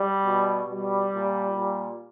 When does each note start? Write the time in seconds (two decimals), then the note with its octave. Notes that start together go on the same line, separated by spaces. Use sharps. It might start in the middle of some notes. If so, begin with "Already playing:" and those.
Already playing: G3
0.24 B2
0.68 B2 G3
1.12 A#2
1.56 A#2